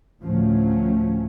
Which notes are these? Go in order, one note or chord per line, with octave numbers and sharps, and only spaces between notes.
D2 A2 F3 F#3 A3 C#4